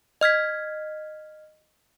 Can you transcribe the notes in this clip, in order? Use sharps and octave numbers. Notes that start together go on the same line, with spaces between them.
D#5 F6 G#6 B6